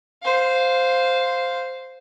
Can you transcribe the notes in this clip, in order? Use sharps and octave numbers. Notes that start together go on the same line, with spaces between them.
C5 F5